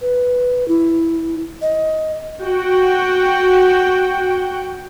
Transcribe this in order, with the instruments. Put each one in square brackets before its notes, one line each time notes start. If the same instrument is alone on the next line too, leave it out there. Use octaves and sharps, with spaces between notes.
[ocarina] B4
E4
D#5
[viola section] F#4 F#5 G5